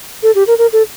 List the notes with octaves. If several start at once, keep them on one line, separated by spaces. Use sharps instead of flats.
A4
G4
A#4
A#4
A4